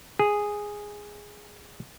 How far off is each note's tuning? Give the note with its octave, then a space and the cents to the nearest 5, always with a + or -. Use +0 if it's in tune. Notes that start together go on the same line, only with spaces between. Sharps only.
G#4 -5